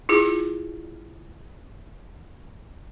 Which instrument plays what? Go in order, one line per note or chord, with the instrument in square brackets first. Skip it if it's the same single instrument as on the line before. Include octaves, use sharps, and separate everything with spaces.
[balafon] E4 F4 G#4